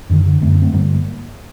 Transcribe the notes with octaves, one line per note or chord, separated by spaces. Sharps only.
F#2 D3 D#3
D3
F#2 D3 A3 C4
A#3 D4
A3 C4
G2 D3 G3 A#3
A#3